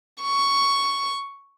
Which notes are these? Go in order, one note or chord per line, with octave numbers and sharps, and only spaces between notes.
C#6